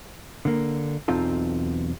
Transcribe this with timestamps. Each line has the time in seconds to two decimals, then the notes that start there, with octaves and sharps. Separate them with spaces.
0.45 D3 A#3
1.08 B1 E2 C4 D#4 F4 A4